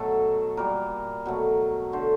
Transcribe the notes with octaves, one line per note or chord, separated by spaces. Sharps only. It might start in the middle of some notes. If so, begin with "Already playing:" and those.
Already playing: B2 F#3 A3 A4
A#2 G3 A#4
B2 F#3 A3
D3 F#3 A3 C5